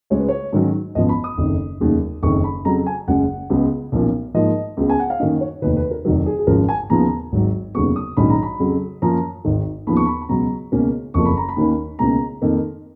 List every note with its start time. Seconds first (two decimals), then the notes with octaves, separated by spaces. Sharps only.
0.10 C#2 C#3 G#3 C#5
0.19 B4
0.29 C#5
0.53 G#2 D#3 F#3 C#4
0.95 G#1 F#2 F3 B3 D#5
1.09 B5
1.24 D#6
1.38 F#1 F2 D#3
1.80 F1 D#2 C#3 F#3
2.23 F#1 F2 D#3 C#6
2.44 B5
2.65 F2 C#3 F#3 A#5
2.87 G#5
3.07 F#1 F#2 C#3 G#3 C#4 F#5
3.50 C#2 C#3 G#3 B3
3.92 B1 A#2 F3 A#3 C#4
4.34 G#2 F3 A#3 D#5
4.77 C#2 C#3 G#3 B3
4.90 G#5
5.00 F#5
5.10 F5
5.20 F#2 D#3 A#3 C#4 D#5
5.41 C#5
5.62 F1 D#2 D#3 B4
5.77 B4
5.91 A#4
6.05 F1 F2 D#3 F#3 A#4
6.26 G#4
6.39 G#4
6.47 G#1 F#2 C#3 F3 A#4
6.69 G#5
6.90 D#2 C#3 F3 B3 A#5
7.32 G#1 G#2 F#3
7.75 F1 D#2 C#3 F#3 B3 C#6
7.96 D#6
8.17 A#1 G#2 D#3 F#3 C#4 B5
8.30 A#5
8.43 B5
8.59 F2 C#3 F#3
9.02 F#2 F3 A#3 C#4 A#5
9.45 G#1 G#2 D#3
9.87 D#2 C#3 F3 B3 B5
9.97 C#6
10.06 B5
10.22 B5
10.29 C#2 B2 F#3 A#5
10.72 C#2 B2 A#3 C#4
11.14 F#1 F2 F3 A#3 C#6
11.26 B5
11.37 A#5
11.49 B5
11.56 D#2 D#3 A#3 C#4
11.99 C#2 B2 A#3 C#4 A#5
12.42 F2 D#3 A#3